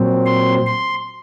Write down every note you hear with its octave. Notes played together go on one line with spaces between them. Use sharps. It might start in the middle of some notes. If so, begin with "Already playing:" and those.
Already playing: A#2 F#3 C4
C6
C6